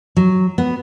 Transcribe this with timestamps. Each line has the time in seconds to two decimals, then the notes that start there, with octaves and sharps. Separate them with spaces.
0.17 F#3
0.58 B3